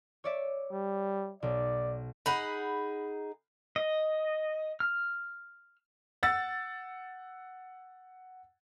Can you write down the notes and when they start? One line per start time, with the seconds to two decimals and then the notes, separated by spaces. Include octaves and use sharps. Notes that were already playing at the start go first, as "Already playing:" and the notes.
0.24 C#5 D5 E5
0.72 G3
1.42 B1 D5
2.26 D#4 G#4 F#5 B5
3.76 D#5
4.80 F6
6.23 F#5 E6 A6